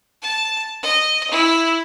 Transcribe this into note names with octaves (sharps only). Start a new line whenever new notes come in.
A5
D#5
E4